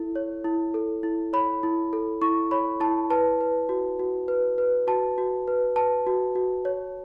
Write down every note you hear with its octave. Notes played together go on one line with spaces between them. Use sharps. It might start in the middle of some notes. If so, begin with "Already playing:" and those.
Already playing: E4 A4
C#5
E4
A4
E4
C#5 B5
E4
A4
E4 C#6
C#5 B5
E4 A5
B4 A5
B4
F#4
F#4
B4
B4
F#4 A5
F#4
B4
B4 A5
F#4
F#4
C#5